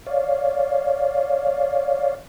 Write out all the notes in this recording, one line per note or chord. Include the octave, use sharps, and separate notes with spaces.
C#5 D5 F5